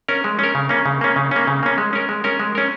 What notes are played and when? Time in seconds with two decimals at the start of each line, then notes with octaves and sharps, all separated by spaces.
0.08 C#4 A#4
0.24 G#3
0.39 C#4 A#4
0.55 C#3
0.69 A#3 C#4
0.86 C#3
1.01 A#3 C#4
1.16 C#3
1.31 A#3 C#4
1.47 C#3
1.63 A#3 C#4
1.78 G#3
1.93 C#4 A#4
2.09 G#3
2.24 C#4 A#4
2.40 G#3
2.55 C#4 A#4